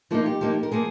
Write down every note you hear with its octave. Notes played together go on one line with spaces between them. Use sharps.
F3 A#3 D#4 F4
G4
F3 A#3 D#4
A#4
F3 A#3 G#4